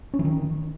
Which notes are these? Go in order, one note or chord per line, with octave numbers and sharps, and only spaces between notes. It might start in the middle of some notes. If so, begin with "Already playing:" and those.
C#4
E3
D#3